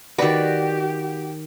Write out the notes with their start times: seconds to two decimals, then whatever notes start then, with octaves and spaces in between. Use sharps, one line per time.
0.18 D#3 F#4 G4 B4 D5